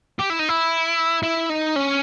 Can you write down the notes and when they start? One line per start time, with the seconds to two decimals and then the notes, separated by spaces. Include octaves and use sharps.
0.19 G4
0.30 E4
0.39 D#4
0.49 E4
1.23 E4
1.50 D#4
1.76 C#4